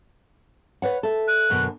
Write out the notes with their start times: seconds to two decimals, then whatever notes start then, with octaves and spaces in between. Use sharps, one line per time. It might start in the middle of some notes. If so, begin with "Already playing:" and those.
0.82 B4 C#5 F#5
1.03 A4 E5
1.28 F#6
1.50 F#2 B2 D3